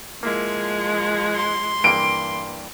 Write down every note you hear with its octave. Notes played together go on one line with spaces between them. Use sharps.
F3 G#3 A#3 E4 A#4
C6
G2 E3 A#3 D7